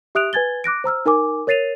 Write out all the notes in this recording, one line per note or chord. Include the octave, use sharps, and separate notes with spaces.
G4 E5 D#6 F#6 D7 F7
B4 G#5 G#6 A6 G7
D6 F#6 A#6 D7
C5 A#5 E6 F6
D#4 A#4 G#5 D6
A#4 C#5 A6 C7 D#7 F7